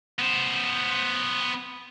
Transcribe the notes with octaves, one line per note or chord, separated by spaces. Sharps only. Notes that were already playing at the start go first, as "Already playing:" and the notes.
B3 C5